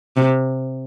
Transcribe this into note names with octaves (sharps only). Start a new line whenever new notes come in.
C3